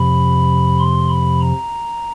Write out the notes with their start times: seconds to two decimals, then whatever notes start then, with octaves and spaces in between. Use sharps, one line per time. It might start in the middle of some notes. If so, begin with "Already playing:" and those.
Already playing: F2 C3 F3 B5
0.79 C6
1.09 B5
1.40 A#5